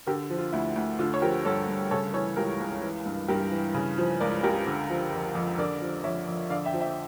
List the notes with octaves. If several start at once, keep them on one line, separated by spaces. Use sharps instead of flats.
D3 G4 A#4
F3
F4
D2 E4
D2
D3 F4
C#5
F3 G4 A#4
G2 A4 C#5
G2
C#3 A4 C#5
E3 A4 C#5
C#2 G4 A#4
C#2
E3
G2
G2 G4 A#4
E3
C#3
F3
C#2 A#4 D5
C#2 G4 A#4
D3
F3
F2
F2
D3 A#4 D5
F3
F2 C#5 E5
F2
D3 D5 F5
E5 G5
F3
E5 G5